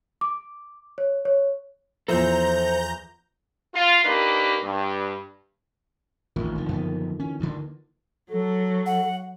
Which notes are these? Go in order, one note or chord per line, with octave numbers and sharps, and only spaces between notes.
D6
C#5
C#5
E2 F3 A4 C5 E5 A#5 G6
F4
D#3 A#3 D4 D#4 G4 B4
G2
A1 E2 D#3 A#3 F4
F1 D3 F3
F#2 F3 B3
E3 C#4
D2 G2 D3
F#3 A4
F#5